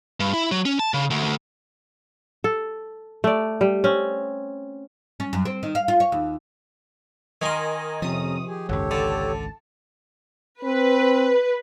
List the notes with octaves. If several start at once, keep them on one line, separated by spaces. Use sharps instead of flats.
G2
E4
F#3
C#4
A5
C#3
D2
D2
A4
A3 D5
G3
C4 C#4
C#4
F#2
C4
D#3
F5
F4
C#5
D#2
D#3 A#4 D#5 G#5 C6
F2 C3 F3 C#4 A#5 D#6
G4 G#4 G#5
G#1 C#2 F#2 G4 A4 C#5
D3 A5
C4 B4